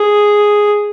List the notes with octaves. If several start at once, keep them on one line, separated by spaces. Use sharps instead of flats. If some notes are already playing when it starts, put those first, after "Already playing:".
Already playing: G#4